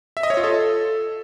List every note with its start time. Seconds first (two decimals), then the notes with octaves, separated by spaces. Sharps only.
0.17 E5
0.23 D#5
0.30 C#5
0.37 F4
0.44 A4